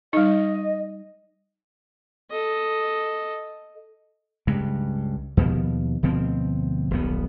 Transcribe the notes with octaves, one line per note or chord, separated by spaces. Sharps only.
G3 D#4 D#5
A4 D#5
C#2 G2
D#2 B2 F3
D2 B2 F3 C4
D#1 B1 B3